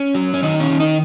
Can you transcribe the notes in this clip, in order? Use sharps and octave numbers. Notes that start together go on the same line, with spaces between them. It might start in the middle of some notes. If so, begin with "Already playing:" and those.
Already playing: C#4
F#3
C#4
D#3 D#4
C#4
D#3
D#4